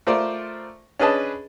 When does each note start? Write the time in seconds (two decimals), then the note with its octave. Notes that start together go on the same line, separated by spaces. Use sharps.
0.07 A3 F4 A#4 C5 D5
0.99 C#4 D4 G#4 B4 D#5 A5